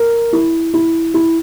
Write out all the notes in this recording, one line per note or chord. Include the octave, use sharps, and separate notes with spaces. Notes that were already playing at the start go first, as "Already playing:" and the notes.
Already playing: A#4
E4
E4
E4